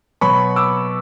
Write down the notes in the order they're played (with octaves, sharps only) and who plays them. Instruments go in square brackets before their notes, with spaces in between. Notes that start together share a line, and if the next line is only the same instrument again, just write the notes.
[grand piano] B2 F#3 B3 B5 C#6
D6 E6